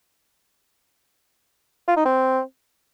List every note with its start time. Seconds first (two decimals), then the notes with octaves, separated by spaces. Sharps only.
1.88 F4
1.97 D#4
2.05 C4